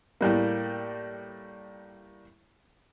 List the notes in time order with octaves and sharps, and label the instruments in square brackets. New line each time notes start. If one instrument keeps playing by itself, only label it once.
[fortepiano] A2 G3 A#3